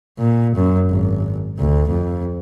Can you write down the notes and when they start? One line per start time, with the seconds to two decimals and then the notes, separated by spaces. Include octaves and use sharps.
0.18 A#2
0.56 F#2
0.89 G#1
1.59 D2
1.89 F2